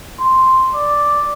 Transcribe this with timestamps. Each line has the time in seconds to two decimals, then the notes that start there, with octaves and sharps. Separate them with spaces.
0.20 C6
0.74 D5